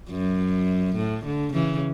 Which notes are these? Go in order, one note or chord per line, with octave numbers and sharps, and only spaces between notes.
F#2
A2
D3
C#3 E3